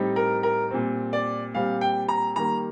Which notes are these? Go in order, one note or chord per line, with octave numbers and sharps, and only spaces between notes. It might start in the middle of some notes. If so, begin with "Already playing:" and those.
Already playing: A2 G3 C4 D#4
A#4
A#4
A#2 G3 C4
D5
A#2 G3 C4 F5
G5
A#5
D#3 G3 A#3 A#5